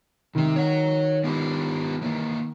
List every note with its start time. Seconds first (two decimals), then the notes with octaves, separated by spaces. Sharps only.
0.35 C3 D#3 C4
0.56 C#5 F#5
1.24 B3 F4 G4
2.02 E3 A#3